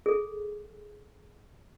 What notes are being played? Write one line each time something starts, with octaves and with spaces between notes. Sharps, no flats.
G#4 A4